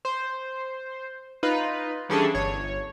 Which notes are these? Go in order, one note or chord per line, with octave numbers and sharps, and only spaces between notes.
C5
D#4 F4 B4
E3 G3 C#4 D4 G#4 A4
G1 C#5